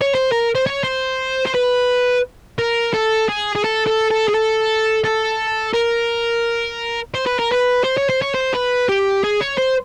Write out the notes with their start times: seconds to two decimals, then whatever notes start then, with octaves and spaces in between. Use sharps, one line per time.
0.02 C#5
0.15 C5
0.32 A#4
0.55 C5
0.67 C#5
0.84 C5
1.46 C5
1.55 B4
2.59 A#4
2.93 A4
3.29 G#4
3.55 G#4
3.64 A4
3.87 A4
4.11 A4
4.29 G#4
4.35 A4
5.04 A4
5.74 A#4
7.14 C5
7.26 B4
7.39 A#4
7.52 B4
7.84 C5
7.97 C#5
8.09 C5
8.22 C#5
8.35 C5
8.54 B4
8.89 G4
9.24 G#4
9.41 C#5
9.58 C5